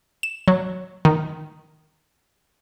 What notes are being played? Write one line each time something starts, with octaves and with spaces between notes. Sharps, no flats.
E7
F#3
D#3